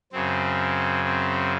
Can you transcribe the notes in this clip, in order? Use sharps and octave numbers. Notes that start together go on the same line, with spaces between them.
F#2 C#3 C4
C4